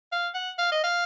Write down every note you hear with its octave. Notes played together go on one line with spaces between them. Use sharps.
F5
F#5
F5
D#5
F5